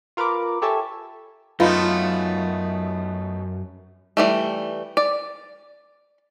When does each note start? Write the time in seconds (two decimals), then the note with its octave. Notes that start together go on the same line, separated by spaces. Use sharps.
0.17 F4 A#4 B4 B5 D6
0.62 G4 A4 C#5 E5 G#5 A5
1.60 F#2 A3 B3 D#4 F4
4.17 E3 G3 A3
4.97 D5